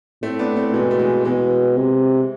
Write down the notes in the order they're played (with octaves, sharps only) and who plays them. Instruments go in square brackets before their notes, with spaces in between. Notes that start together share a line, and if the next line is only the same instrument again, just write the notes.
[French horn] A2 [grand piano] A3 C4
[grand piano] B3 D4
A3 C4
[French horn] B2 [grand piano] E3 G#3
[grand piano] A3
E3 G#3
[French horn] B2 [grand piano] E3 G#3
[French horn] C3